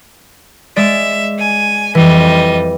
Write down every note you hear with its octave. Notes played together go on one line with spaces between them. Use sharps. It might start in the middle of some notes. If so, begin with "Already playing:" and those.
G#3 D5 E5
G#5
F2 E3 G3 D#5